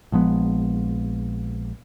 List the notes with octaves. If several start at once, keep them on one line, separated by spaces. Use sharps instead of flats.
A#1 F3 G#3 B3